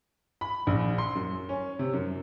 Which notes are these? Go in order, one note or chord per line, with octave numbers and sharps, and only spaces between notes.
B5
A#1
C6
F#2
C#4
C3
F#2